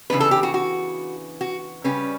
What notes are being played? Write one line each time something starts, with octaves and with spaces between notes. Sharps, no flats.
C#3 E3 G3 B3 D4 B4
A4
G4
F#4
F#4
F#4
C#3 G3 C#4 B4